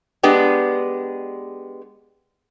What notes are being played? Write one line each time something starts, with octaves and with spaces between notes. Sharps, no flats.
G#3 B3 D4 G4